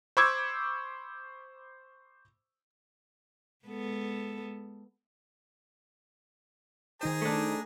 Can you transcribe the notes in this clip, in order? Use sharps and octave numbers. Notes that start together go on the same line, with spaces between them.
C5 B5 C#6 D6 E6 G#6
G#3 B3 A4
D#3 D#4 G#4 C5 A#5
A3 D4